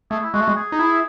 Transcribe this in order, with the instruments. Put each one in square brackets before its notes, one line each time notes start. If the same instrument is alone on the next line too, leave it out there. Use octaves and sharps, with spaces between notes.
[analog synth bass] A3 [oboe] G#4
[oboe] E4
[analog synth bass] G#3 [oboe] F#4
[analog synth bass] A3
G#3
[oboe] G#4
[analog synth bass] D#4
[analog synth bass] E4 [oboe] G#4